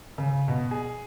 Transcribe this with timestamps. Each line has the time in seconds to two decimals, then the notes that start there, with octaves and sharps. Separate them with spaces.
0.18 C#3
0.48 B2
0.71 G#4